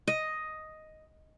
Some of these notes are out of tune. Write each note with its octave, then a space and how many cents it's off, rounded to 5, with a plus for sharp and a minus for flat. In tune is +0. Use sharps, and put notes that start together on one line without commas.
D#5 +5